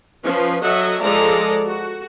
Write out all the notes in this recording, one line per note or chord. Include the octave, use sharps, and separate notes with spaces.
F3 C#4 B4
F#3 A4 D#5 E5 F#5
F3 G#3 A4 D5 A#5
F#4